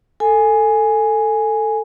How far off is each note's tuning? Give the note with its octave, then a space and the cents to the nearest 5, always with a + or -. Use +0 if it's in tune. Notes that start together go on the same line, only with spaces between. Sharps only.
A4 +10 G#5 +0